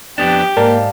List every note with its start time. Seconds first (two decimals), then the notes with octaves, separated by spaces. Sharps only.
0.18 F2 B3 D4 G4
0.57 G#2 A#3 D5 F5 A5